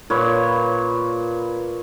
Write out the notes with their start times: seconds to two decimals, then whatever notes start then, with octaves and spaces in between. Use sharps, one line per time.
0.10 A#2 B4 C#5